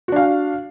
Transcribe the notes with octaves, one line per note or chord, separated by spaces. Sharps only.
D4 F#4 F5